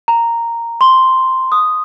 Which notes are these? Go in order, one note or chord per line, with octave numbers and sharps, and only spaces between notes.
A#5
C6
D#6